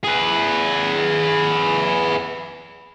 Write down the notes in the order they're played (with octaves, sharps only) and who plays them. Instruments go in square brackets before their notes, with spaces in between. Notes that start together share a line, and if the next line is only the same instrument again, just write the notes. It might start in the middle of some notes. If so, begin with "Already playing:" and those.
[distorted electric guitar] G#4 B4